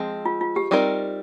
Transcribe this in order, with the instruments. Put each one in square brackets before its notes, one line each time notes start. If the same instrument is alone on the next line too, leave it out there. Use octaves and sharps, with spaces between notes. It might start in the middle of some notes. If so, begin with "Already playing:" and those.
Already playing: [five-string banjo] F3 G#3 C4
[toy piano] F4
F4
G4
[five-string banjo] G3 C4 D#4 A#4 D5